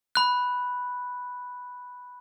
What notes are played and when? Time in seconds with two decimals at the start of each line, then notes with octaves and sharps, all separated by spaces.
0.15 B5 F#6